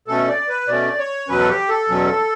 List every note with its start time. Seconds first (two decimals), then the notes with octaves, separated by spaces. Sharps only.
0.08 B2 A3 C#4 A4
0.28 D5
0.48 B4
0.68 B2 A3 C#4 D5
0.99 C#5
1.28 E2 B2 F#3 C#4 B4
1.39 A4
1.49 G4
1.69 A4
1.89 E2 B2 F#3 C#4